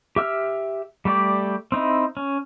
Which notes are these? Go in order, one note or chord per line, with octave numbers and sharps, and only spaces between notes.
G4 E5 E6 F6
G3 A3 G4 D5
C4 D#4 E4
C#4